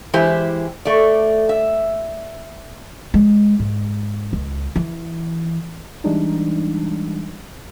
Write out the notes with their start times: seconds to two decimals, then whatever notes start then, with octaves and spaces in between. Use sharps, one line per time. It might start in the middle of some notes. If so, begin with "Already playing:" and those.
0.14 E3 G#3 E4 G4 C5
0.85 A3 D5
1.49 E5
3.14 G#3
3.59 G#2
4.33 C#2
4.76 E3
6.04 E3 G3 G#3 D4 D#4